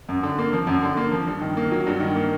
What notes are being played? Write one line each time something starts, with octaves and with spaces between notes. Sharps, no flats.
F#2
D3
A#3
F3
F#2
D3
A#3
F3
G2
D#3
A#3
F#3
G2
D#3
A#3